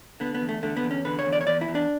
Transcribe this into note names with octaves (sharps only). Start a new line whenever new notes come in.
D3 B3
B3
E2
A3
D3 A3
B3
E2
C#4
D3 B4
C#5
E2
D5
C#5
E2 D5
E4
E2
D4